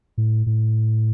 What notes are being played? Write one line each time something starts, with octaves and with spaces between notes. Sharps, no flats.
A2
A2